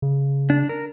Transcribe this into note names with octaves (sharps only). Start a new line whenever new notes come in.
C#3
D4
A#4